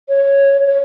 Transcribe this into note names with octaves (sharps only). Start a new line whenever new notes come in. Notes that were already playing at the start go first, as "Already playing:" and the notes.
C#5
C#5